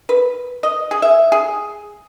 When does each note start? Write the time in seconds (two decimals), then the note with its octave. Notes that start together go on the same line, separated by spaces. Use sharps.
0.09 B4
0.63 D#5
0.91 G#4
1.02 E5
1.32 G#4